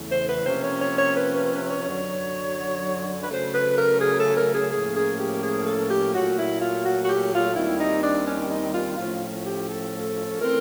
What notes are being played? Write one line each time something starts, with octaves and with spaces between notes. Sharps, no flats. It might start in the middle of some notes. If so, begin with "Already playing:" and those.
Already playing: E2 C#3 E3 A3
C5
B4
C3 F3 A#3 C#4 C5
C#5
C#5
C#5
B4
B4
B4
C#5
F#2 D3 F#3
B4
C#3 F#3 A3 C5
B4
A#4
G#4
A4
A#4
G#4
A2 F3 A#3 C#4 G#4
G#4
G4
G#4
A4
G4
A#2 F#3 A3 F#4
E4
F4
F#4
F#4
G4
F4
D#2 D#3 G3 C4 E4
D#4
D4
C#4
D#4
F4
A2 F3 A3 C#4 F4
G4
A4
E3 A3 C4 A#4